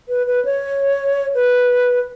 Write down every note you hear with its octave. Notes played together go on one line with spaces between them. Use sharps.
B4
B4
C#5
B4